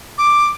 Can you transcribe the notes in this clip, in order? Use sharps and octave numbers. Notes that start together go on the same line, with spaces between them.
D6